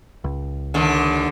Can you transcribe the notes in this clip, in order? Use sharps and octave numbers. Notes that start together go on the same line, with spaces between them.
C#2
D#2 D3